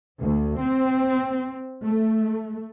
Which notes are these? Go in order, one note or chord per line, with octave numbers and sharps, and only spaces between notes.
D2
C4
A3